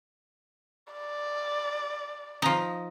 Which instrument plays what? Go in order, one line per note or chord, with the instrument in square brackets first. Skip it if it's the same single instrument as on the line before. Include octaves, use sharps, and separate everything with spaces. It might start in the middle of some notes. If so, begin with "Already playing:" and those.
[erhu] D5
[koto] F3 D#4